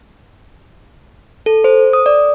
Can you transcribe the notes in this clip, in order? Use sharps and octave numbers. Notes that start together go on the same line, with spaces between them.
A4
C5
D#6
D5